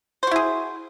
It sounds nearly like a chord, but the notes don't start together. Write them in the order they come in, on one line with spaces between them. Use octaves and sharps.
C5 F#4 E4 G#4